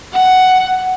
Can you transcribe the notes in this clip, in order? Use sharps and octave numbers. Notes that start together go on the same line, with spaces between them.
F#5